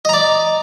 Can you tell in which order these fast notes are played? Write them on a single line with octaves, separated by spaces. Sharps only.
D#5 A#5 D5